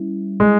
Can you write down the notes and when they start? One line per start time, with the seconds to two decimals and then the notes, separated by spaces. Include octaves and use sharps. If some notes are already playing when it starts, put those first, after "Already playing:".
Already playing: G3 C#4 E4
0.40 G#3